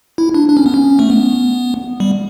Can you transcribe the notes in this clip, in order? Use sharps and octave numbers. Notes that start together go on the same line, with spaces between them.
E4
D4
D4
C#4
B3
C#4
A3
B3
G3